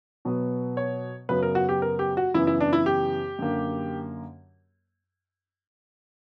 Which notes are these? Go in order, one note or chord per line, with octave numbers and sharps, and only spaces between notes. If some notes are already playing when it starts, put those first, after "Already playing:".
B2 F#3 B3
C#5
F#2 C#3 F#3 B3 B4
A#4
F#4
G4
A#4
G4
F#4
F#2 C#3 E3 B3 E4
E4
D4
E4
G4
F#2 D3 A#3